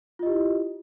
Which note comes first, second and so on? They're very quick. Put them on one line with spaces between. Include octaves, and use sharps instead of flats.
F4 D#5 G4 E4